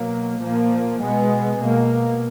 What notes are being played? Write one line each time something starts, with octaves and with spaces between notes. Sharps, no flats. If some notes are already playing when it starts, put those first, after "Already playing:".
Already playing: B2 F#3 A#3
A#2 F3 A#3
B2 G#3 B3
B2 A#3